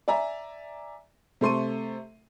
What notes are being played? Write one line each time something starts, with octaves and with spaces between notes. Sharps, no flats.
D5 E5 G#5 A#5
C3 A3 A4 C6 C#6 D#7